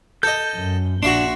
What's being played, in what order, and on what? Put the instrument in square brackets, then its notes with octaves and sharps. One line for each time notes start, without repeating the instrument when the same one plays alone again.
[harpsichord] A4 D#5 [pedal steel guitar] G6
[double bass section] F#2
[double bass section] A#1 [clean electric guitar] D4 [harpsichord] F#4 E5 C6